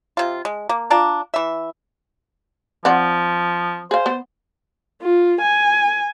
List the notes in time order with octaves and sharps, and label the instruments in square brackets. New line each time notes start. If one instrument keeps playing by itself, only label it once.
[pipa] C3 F4
G#3
A#3
D4 F4 D5 A#5
E3 E5
[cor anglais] F3 [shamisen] C4 D5 F#5
[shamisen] G#4 F5 [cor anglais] C5
[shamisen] B3
[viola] F4
G#5